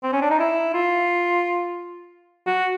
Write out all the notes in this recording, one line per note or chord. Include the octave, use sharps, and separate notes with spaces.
C4
C#4
D4
D#4
E4
F4
F#4